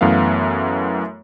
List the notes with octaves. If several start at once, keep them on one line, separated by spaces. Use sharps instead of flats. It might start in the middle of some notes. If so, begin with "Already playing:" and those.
F#2 E3 A3 B3 F5